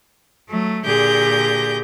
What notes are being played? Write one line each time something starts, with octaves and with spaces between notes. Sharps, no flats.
F#3 A3
A#2 D3 G4 G#4 G6 A#6